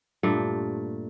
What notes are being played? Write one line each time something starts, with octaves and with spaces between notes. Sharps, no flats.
G2 A#2 A3